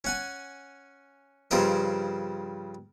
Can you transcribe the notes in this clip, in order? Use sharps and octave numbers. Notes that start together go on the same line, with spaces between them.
C#4 F#5 G#5
G2 C#3 F3 C4 A#4 D#5